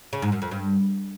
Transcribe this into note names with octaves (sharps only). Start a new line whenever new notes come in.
C#3
G#2
F#2
F2
G2